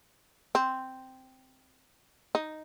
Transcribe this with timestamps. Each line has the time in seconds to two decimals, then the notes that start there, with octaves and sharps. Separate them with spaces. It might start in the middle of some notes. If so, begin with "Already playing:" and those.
0.55 C4
2.35 D#4